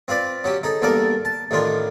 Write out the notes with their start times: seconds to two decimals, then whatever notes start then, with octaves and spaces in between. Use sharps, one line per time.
0.08 C4 F4 B4 D5
0.44 F#3 C#4 G4
0.63 D#4 G#4 A4
0.82 E2 G2 A#3 A4 A#4 D5
1.25 A5
1.51 A1 A2 D#3 D4 F4